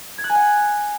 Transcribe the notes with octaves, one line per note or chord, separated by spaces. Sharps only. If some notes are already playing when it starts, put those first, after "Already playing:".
G#6
F#6
G#5
F#5